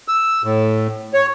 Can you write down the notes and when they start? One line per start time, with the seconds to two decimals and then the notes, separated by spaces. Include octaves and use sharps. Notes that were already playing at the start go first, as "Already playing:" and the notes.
0.08 E6
0.44 A2
1.14 C#5